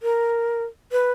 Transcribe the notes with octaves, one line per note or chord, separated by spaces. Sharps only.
A#4
B4